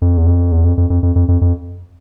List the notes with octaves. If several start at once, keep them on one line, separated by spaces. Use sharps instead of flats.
F2
E2
F2
E2
F2
F2
F2
F2
F2
F2
F2